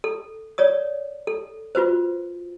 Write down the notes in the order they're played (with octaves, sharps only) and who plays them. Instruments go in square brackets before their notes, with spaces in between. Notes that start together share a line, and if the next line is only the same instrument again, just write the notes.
[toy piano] A4
C#5 D5 D#6
A4
F4 F#4 B4 C5